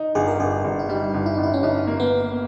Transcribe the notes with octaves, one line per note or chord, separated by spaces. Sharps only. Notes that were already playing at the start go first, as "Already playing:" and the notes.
Already playing: D#4
G1 G#4
A#4
G1 G#4
G1
E4
G3 D#4
G1
E4
G1 D#4
E4
C#4
G1 D#4
A#3
B3